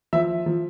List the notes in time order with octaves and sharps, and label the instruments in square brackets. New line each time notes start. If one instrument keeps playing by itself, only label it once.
[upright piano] F3 E5
F3